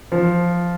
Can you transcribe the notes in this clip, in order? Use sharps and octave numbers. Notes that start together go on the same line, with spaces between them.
F3